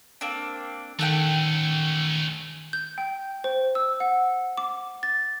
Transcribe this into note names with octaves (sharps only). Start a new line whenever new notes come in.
A#3 C4 D4
D#3 A3 C#4 A4 F#5 G5
G6
G5
C5
E6
F#5
D6
A6